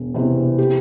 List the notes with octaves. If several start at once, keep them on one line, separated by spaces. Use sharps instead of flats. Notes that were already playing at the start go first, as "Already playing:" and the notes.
Already playing: E1
E2 C3 E3
G4